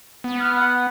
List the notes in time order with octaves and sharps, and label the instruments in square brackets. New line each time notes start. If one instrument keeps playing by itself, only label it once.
[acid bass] B3
[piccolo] F6
F#5